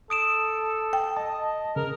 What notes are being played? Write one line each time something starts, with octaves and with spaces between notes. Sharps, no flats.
A4 D#6 D7 E7
G5
D#5 A5
C#3 A#4